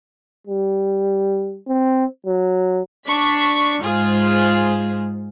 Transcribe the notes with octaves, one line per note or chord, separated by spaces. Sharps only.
G3
C4
F#3
D4 C#6 B6
G#2 F4 G#4 C5